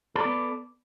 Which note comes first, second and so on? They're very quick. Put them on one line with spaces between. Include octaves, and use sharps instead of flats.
A4 D5 B3